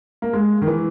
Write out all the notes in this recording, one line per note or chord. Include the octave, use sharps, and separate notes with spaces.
A#3
G#3
D#3
E3